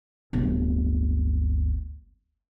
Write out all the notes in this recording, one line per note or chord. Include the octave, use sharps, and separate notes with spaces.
D1 G1